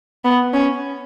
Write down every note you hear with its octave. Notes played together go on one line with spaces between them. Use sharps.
B3
C#4